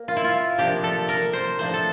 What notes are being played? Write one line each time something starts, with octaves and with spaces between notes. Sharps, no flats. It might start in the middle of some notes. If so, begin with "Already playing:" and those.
Already playing: A#3
F4
E4
F4
C3 F3 A#3 D4 G4
A4
A#4
C5
A2 F3 A3 D4 C5
A4